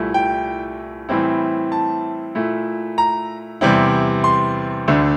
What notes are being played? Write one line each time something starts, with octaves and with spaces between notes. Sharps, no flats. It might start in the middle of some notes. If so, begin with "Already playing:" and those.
Already playing: C2 A#2 A3 E4
G5
A2 E3 G3 C4 E4
A5
A#2 A3 E4
A#5
E2 C3 G3 C4 E4
C6
D2 D3 A3 D4